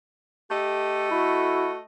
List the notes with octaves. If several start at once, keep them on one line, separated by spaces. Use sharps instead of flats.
A3 G4 A4 D#5
E4 F#4